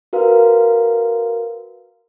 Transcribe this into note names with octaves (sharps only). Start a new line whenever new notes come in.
F#4 A#4 B4 F5